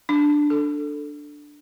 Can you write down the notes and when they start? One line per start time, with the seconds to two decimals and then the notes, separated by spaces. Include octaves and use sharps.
0.09 D4
0.50 A4